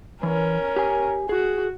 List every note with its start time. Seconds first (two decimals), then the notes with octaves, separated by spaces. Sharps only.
0.23 E3 C#4 A#4
0.76 G4 G#5
1.29 F#4 G#4